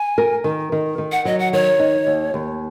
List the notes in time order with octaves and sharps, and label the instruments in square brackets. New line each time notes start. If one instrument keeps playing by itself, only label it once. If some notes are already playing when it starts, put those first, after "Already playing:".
Already playing: [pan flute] G#5
[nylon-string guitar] A#4
D#3
D#3
D#3
[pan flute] F#5
[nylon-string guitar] F#3 [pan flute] D#5
[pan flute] F#5
[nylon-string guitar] D#3 [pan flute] C#5
[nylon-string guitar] D#4
D#2
D#2